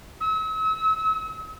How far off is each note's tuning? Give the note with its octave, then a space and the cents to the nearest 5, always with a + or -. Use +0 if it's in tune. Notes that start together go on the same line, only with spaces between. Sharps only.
E6 -40